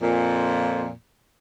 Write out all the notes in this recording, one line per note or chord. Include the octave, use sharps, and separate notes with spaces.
F2 A#2